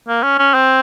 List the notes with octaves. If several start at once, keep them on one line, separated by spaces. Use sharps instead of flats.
A#3
C#4
C#4
C4